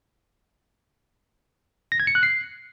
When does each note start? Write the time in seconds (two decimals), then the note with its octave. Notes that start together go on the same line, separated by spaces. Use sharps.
1.92 A#6
2.00 G#6
2.07 C#7
2.15 F#6
2.23 C7